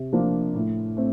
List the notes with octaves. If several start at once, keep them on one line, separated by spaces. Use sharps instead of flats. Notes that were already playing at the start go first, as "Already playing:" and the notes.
Already playing: C3
F3 A#3 D4 F4
A2
A3 C4